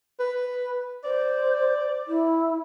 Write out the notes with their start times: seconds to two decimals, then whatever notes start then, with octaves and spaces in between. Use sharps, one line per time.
0.20 B4
1.04 C5 D5
2.08 E4